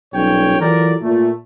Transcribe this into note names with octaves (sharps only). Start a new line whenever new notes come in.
B1 A#2 G3 C#4 C#5 G5
E3 F#3 F4 A4 A#4 D5
A#2 A3